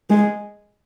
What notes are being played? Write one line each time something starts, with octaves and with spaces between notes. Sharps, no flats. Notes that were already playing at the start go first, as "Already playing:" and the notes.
G#3